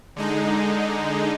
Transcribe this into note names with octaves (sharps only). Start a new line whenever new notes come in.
D3 G#3 D#4